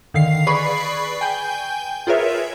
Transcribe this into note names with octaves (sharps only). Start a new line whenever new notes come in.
D3 D#3 F5 C7
G#4 B4 D5 B5 C#6 C7
G5 G#5 G6
F4 G#4 A#4 B4 C#5 E5